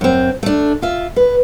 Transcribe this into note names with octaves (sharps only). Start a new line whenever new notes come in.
F#2 C4
A3 D4
F4 E5
B4